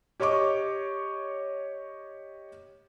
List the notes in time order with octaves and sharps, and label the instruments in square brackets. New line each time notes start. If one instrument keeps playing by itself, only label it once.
[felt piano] G4 C#5 D#5 C#6 D6